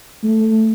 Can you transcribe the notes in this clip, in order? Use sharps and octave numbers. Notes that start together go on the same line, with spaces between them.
A3